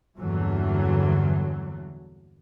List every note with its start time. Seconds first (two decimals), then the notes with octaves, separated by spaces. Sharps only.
0.16 E2 G2 A#2 D3 E3 F#3